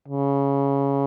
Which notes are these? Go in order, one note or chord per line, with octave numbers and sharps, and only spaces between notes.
C#3